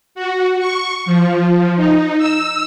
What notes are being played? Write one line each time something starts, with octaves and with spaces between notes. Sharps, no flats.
F#4
C#6
F3
D#4
E6